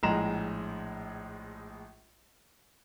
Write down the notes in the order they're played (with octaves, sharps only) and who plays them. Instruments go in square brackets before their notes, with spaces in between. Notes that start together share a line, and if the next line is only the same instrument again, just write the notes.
[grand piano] A#1 A2 G#3 A#5 E7